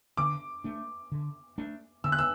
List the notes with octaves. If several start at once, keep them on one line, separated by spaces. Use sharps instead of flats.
D3 D6
A3 D4
D3
A3 D4
D3 E6
F#6
E6